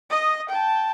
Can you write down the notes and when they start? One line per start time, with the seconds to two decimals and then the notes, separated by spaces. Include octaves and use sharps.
0.10 D#5 D#6
0.49 G5 A5